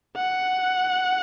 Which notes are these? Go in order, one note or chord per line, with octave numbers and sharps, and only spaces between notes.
F#5